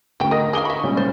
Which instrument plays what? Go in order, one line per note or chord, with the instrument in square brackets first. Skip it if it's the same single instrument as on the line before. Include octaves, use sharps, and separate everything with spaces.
[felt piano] D2 [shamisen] C#3 G5
[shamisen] A#4 [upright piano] D#5 D#6 A#6
[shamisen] G#4 F5 [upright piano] D6 G7 [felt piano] D#6
[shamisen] E5 B5 [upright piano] C#6
[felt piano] C#2 [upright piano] A#2 G3 C#4
[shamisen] C5 [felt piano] A6